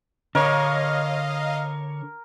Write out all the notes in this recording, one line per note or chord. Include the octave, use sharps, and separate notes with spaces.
D3 A#4 C#5 D#5 F5